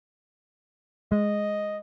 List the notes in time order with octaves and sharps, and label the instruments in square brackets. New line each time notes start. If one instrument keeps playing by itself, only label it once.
[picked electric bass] G#3 [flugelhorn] D#5